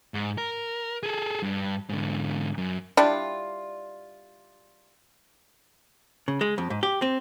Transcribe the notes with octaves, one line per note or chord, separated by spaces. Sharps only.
G#2
A#4
G#4 A4
G2
G#2 D3
F#2
G3 D4 E4 F4
C#3
G#3
F2
G#2
G4
C4